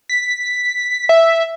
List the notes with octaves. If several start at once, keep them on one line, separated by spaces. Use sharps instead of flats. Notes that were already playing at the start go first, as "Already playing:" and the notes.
B6
E5